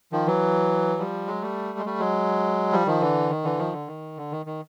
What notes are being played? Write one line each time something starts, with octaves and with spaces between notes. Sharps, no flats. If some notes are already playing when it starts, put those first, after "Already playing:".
D#3 F3
E3 F#3
F3 G3
F#3 G#3
G3 A3
G#3
G3 A3
F#3 G#3
F3 G3
D#3 F3
D3 E3
D#3
D3 E3
D#3 F3
D3
D#3
D3
D#3
D#3